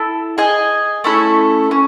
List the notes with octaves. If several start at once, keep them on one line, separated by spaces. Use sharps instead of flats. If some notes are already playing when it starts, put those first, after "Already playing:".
Already playing: E4 A4
G#4 D#5 G#5
A3 C#4 E4 A4
C#4